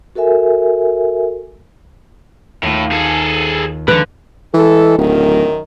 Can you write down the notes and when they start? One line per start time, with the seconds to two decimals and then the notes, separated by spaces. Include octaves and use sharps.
0.15 F#4 A4 A#4 E5 G#5
2.63 D#2 A2 F4
2.92 G#4 A4
3.88 D3 D#3 F3 G#3 B4
4.54 E3 G#3 A4
4.98 D1 F#2 D#3 A#4